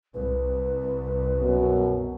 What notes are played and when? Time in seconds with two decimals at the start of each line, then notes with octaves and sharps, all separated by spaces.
0.14 C2 B4
1.40 F#2 B2